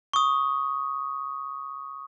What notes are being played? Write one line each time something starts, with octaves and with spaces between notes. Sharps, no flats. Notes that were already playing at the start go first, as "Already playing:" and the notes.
C#6 D#6